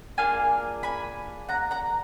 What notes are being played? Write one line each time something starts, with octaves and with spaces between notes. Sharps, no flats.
A#3 D4 F4 G#4 F5 G#5
G#5 B5
F#5 A#5
F#5 A#5